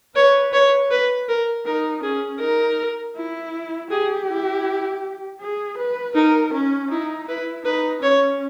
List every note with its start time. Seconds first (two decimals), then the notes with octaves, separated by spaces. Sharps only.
0.16 B4 C#5
0.53 C#5
0.91 B4
1.29 A#4
1.66 D#4 A#4
2.03 C#4 G#4
2.41 D#4 A#4
3.16 E4
3.90 G4 G#4
4.28 E4
5.41 G#4
5.78 B4
6.15 D#4 A#4
6.54 C#4
6.91 D#4 E4
7.28 E4 B4
7.65 D#4 B4
8.02 C#4 C#5